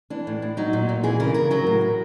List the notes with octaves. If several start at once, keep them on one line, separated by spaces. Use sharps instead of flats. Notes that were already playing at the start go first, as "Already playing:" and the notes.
E3 D4
A2
A2
F#3 D#4
A#2
A#2
E3 G#4
C#3 A#4
C#3 A#4
F#3 A#4
A2
A2